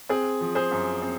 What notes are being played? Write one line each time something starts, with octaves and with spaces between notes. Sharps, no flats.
C4 G#4
F3
G#4 C5
F#2
C4